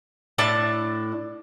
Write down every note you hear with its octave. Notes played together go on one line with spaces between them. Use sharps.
A2 D4 E4 A5